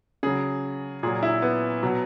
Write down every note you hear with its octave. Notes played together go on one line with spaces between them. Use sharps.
C#3 F#3 G#4
A#2 F#3 G#4
E4
B3
B2 F#3